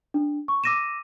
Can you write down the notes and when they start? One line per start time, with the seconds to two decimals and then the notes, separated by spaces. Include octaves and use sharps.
0.14 D4
0.48 C#6
0.64 D6 E6 A#6 D#7 E7